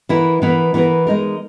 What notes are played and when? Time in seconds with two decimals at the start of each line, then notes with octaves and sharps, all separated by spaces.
0.09 E3 B3 E4 A#4
0.42 E3 B3 E4 A#4
0.74 E3 B3 E4 A#4
1.07 G#3 D#4 A#4